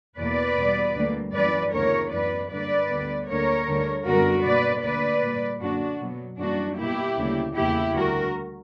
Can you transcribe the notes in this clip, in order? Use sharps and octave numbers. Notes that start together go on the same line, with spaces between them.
E2 B2 A#3 B4 D5
E2 B2 G3 B3
D2 D3 G3 A#3
F#2 E3 G3 A#3 B4 D5
D2 C#3 E3 B3 A#4 C#5
F#2 E3 B3 B4 D5
G2 D3 A#3 B4 D5
D2 D3 G3 B3
D2 D3 A#3 A#4 C#5
D2 D3 G3
F#2 D3 G3 B3 F#4 A#4
B2 A#3 B4 D5
D2 D3 A#3 B4 D5
A#2 G3 A#3
F#2 D3 A#3 D4 F#4
B2 F#3 B3
F#2 E3 G3 A#3 D4 F#4
B2 A#3 E4 G4
D2 C#3 G3 A#3
E2 C#3 E3 A#3 E4 G4
D2 D3 G3 F#4 A#4